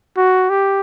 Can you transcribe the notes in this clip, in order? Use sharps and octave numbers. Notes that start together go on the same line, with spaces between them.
F#4
G4